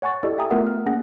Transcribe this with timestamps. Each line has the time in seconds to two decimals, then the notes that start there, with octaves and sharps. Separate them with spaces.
0.02 C#5 F#5 G#5 C#6 A6
0.23 E4 G4 A4 D5 D#5
0.38 E5 G5 G#5 A#5 D#6
0.50 A3 B3 F4 A#4 E5 F#5
0.67 F6
0.86 A#3 C#4 G#4 F#5 A#6